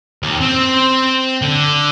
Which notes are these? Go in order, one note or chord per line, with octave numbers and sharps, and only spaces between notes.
D#2
C4
D3